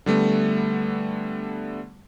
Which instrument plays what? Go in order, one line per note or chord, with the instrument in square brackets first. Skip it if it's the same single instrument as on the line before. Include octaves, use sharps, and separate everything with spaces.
[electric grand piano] D3 G3 A3 B3